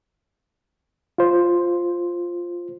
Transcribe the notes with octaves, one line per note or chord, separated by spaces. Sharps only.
F4 C5